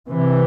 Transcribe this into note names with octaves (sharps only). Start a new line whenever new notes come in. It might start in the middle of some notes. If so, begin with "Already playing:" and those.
C3 E3